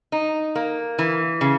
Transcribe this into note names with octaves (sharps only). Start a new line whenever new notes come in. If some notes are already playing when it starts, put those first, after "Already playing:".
D#4
A#3
E3
C#3